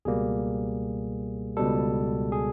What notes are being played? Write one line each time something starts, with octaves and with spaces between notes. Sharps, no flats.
C#2 B2 G3 A#3 G#4
C#2 B2 G3 A4
G#4